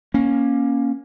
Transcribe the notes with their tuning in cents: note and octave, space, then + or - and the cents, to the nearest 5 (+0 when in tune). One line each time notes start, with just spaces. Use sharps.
A#3 +20 C#4 +0